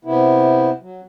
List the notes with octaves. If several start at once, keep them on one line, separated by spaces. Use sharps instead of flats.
C3 B3 E4
F#3